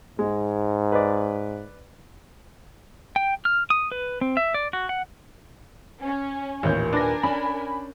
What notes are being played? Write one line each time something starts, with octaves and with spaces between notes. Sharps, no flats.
G#2 G#3
B4 D5
G5
F6
D#6
B4
C4
E5
D5
F#4
F#5
C#4
A1 D#2 A#2 D#3 C#4 G6
D4 A#4 B4 G#5 A#6
C#4 D4 B5